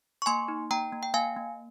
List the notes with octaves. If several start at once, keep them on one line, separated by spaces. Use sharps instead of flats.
C#6
A#3 G#5 C6
D#4
A#3 G5 A#5
A#3
G5
A#3 F5 G#5
A#3